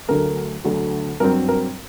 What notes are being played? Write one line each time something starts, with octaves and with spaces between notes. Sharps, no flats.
D2 D3 F#3 A3 A#4
D2 D3 F#3 A3
G2 F#3 C4 A#4
A#4